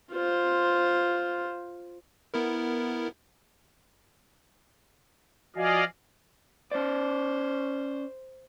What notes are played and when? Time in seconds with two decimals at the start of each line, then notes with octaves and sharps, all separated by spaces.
0.12 F4 C5
2.34 B3 E4 A#4
5.56 F3 F#4 D5 D#5 F5 G#5
6.72 C#4 C5 D5